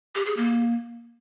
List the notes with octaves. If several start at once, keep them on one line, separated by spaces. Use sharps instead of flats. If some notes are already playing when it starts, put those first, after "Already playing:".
G4
G#4
A#3